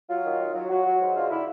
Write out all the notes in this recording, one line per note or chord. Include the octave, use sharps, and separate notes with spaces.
F#3 F4
D#3
F#3
F#3
F#3 F#4
F#3
G#2
D3 F4
D3 E4